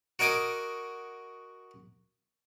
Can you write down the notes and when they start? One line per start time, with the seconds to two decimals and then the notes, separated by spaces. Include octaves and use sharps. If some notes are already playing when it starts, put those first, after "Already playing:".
0.19 F#4 A#4 D#5 G#5 D6 D#6